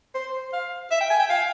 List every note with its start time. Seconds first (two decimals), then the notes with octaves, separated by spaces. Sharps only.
0.15 C5
0.53 F5
0.91 E5
1.01 G5
1.10 G#5
1.20 G5
1.30 F5